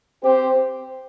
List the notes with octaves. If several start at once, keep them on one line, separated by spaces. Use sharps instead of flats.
C4 G4 C5